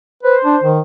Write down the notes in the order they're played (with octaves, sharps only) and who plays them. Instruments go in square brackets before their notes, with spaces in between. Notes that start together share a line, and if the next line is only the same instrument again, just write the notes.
[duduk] B4 [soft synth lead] C5
[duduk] D4
D#3